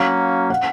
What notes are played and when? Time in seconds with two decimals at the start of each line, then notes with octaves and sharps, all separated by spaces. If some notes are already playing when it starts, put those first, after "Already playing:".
Already playing: F#3 A#3 C#4 F#4 F5
0.50 F#5